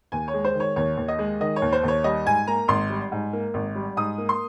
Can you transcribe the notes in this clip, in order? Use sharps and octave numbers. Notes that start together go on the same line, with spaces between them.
D#2 G#5
C#5
G#3
C5
D#3
C#5
D#2 C#5
D#2
D#5
G#3
D#3 D#5
C#5
D#2
C5
D#2 C#5
G3 D#5
G#2 G#5
A#3 A#5
G#1 C6
G3
G#2
A#3
G#1
G3
G#2 D#6
A#3
C6